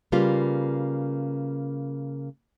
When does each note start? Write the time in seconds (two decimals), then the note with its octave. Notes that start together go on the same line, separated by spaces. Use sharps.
0.12 C#3 G3 A#3 F4 B4